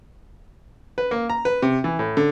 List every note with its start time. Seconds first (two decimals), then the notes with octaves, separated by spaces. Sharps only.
0.98 B4
1.11 A#3
1.30 A#5
1.45 B4
1.62 C3
1.84 E3
1.99 A2
2.17 D3